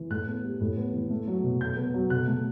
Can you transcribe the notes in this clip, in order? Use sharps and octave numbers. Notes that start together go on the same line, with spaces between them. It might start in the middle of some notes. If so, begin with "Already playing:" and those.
Already playing: E3
A2 F#6
B3
G3
A2
B3
E3
A3
F#3
B2
B2 G6
B3
F#3
B2 F#6
A3